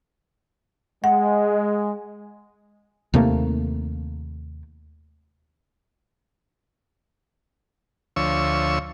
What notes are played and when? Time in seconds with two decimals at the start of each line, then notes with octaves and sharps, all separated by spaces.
1.04 G#3 F#5
3.14 D#2 C3 A3 A#3
8.16 D2 F3 C#5 C#6 E6